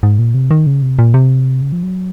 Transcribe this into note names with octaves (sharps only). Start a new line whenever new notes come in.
G#2
A#2
C3
D#3
C#3
C3
A#2
C3
C#3
F3
F#3